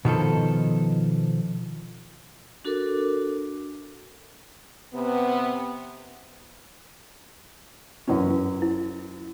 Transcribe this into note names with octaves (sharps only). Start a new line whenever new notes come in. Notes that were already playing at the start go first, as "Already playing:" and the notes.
B2 D#3 F3 A4
D4 F#4 A4 A#4 D6
C3 B3
F#2 E3 C#4
E4